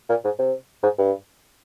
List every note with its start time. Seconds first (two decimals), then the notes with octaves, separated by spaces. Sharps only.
0.09 A#2
0.24 G#2
0.39 C3
0.83 G#2
0.98 G2